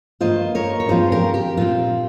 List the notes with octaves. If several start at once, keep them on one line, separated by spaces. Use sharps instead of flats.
G2 D#3 A#3 F4 C5 D#5
A#4 C#5
C#5
G2 F3 C4 F4 G#4 C5
G4 A#4
G4
A#2 G3 C4 F4